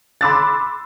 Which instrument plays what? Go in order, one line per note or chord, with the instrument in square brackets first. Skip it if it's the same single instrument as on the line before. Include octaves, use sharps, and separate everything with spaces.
[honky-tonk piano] B5 C6 D6 E6 F#6 A6